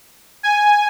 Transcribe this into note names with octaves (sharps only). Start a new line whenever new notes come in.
G#5